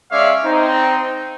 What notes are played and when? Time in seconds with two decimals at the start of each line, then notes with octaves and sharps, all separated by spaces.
0.12 G#3 C#4 C#5 D5 E5 F5
0.44 C4 D#4